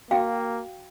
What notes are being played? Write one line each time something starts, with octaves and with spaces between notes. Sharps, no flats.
A#3 F#4 F5 G5